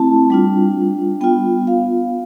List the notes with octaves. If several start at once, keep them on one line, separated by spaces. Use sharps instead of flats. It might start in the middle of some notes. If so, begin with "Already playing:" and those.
Already playing: A3 C4 E4 A5
G3 D4 F4
B3 F4 G5
F5